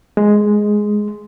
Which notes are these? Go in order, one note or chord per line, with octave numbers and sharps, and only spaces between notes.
G#3